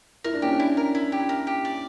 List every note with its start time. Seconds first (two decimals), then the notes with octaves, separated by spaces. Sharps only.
0.24 E4 A#4
0.34 D4
0.42 C#4 G4
0.52 D4
0.60 E4
0.77 A#4
0.95 E4
1.12 G4
1.29 A#4
1.47 G4
1.65 D5